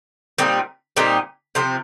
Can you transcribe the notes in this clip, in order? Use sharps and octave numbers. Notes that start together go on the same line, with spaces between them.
A#2 G3 C4 D#4
A#2 G3 C4 D#4
C3 F3 C4